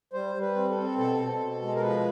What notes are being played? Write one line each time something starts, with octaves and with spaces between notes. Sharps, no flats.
G3 C5
G3
B4
C4
A4
C4
B2 A4
B2
B2
G#3
A#4
F3 B4